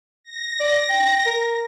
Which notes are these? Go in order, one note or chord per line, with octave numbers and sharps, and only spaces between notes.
A#6
D5
G5
A#4